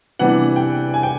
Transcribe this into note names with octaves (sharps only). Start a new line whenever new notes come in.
C3 E3 G3 B3 D4 F#5
G5
G#5
G5